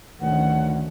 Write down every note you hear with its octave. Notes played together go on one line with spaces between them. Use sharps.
D2 D#3 F3 C#4 F#5